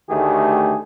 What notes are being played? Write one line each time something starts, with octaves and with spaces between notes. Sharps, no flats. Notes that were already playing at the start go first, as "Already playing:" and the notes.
D2 D#3 A3 G4 G#4